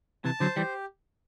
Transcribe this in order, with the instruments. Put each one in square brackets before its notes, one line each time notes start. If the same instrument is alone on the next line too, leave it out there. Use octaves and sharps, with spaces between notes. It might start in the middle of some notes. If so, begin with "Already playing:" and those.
[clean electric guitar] C3 E3 [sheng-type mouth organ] A5
[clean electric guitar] D3 F#3 [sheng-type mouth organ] C5
[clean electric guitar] E3 G3 [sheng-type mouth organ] G4